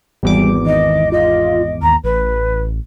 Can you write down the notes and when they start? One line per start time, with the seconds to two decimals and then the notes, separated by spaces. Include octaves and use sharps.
0.23 G#1 E2 G3 D6
0.66 D#3 D#5
1.12 F4 D#5
1.82 D#2 A#5
2.04 A1 B4